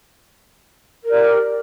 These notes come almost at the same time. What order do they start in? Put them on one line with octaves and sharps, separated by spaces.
A#4 G4 D5